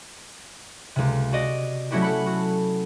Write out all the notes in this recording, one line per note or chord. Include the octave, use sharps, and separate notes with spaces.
C#2 C3
F#4 D5 D#5
F#3 A3 C#4 E4 F#4 G4
A4 F#5 B5
F#4